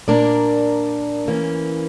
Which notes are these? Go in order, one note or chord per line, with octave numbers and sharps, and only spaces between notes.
A#2 A#3 D4 A#4 D5
E3 A#3 C#4